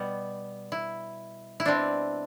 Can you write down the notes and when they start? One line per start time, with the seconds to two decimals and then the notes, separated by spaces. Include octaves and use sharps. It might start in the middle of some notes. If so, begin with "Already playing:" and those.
Already playing: B2 G3 B3
0.72 E4
1.60 E4
1.65 B2 G3 C4 D4